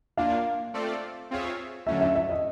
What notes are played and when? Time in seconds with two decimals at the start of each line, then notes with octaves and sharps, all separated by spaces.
0.17 A#3 D4 F4 F5
0.74 A3 C4 F4 A4 D5
1.31 C4 F4 G#4 C#5 E5
1.87 D3 F#3 A3 C#4 E5
2.01 E5
2.15 E5
2.30 D#5